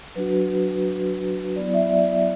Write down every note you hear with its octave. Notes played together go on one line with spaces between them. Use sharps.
F#3 D4 F#4 B4
F#3 B3 E4 D5
D5
E5
D5
D5